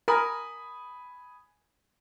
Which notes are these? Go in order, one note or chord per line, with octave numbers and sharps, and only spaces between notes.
A#4 G#5 B5 D#6